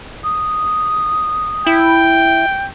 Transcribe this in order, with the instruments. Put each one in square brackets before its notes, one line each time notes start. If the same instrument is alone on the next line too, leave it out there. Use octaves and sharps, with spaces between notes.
[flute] D#6
[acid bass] E4 [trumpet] G5